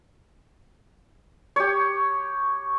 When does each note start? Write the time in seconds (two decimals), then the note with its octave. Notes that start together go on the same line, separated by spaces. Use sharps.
1.56 G4 C#5